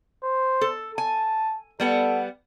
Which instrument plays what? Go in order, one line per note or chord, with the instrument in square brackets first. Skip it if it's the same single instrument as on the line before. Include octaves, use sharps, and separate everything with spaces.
[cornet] C5
[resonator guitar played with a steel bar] A4
[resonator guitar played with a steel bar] G#5 [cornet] A5
[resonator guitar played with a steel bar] G3 B3 F#5 [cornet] A4